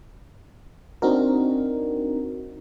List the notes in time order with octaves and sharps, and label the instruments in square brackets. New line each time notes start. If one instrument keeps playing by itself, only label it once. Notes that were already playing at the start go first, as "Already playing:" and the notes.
[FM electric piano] C4 D4 D#4 F#4 A#4